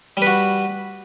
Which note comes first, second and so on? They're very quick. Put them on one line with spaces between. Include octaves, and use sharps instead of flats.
G3 B4 F#4